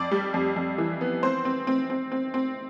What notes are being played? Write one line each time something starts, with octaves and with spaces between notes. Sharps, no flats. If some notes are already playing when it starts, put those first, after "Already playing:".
Already playing: F2 D5
G3
F2
F2
E3
B3
C4 C5
C4
C4
C4
C4
C4